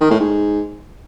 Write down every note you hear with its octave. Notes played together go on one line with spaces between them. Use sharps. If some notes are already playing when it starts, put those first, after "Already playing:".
D#3
A2
G#2